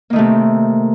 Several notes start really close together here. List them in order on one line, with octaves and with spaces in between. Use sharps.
A#3 D#3 A3 C3